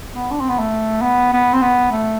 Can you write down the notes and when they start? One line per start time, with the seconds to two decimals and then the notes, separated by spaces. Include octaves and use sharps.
0.14 B3
0.31 D4
0.40 C4
0.49 B3
0.59 A3
1.02 B3
1.33 B3
1.53 C4
1.62 B3
1.92 A3